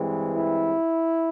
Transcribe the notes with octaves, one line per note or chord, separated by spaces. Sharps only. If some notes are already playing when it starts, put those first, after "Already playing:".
Already playing: G2 E3 G#3 C4
E4